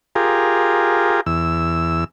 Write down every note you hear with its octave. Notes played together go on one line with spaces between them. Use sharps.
F4 G4 G#4 A#4
E2 E6